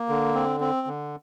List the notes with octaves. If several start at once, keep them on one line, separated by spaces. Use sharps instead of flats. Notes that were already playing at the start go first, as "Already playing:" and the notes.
Already playing: A#3
D3
C4
C4
D3